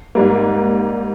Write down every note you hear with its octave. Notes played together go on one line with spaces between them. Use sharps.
G#2 G3 A#3